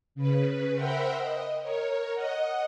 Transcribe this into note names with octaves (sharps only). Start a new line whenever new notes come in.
C#3 B4
A#4 C5 E5 F#5 G5 B5
D#5
A#4 C#5
D#5 F#5